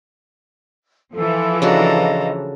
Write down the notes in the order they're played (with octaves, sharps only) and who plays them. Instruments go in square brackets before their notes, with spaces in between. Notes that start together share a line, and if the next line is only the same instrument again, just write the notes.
[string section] E3 F3 [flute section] A4
[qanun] C#3 D4 F#4 [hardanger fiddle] A4 A#5 [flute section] D#5 F5